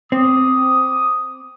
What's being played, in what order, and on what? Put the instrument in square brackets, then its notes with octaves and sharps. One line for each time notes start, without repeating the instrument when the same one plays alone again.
[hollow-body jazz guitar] C4 [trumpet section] D6 D#6